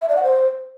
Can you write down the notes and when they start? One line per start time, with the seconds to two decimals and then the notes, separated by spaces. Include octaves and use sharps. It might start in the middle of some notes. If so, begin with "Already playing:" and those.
0.02 E5
0.09 D5
0.16 F#5
0.23 C5